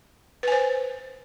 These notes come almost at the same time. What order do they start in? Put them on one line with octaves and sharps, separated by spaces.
B4 G#5 C5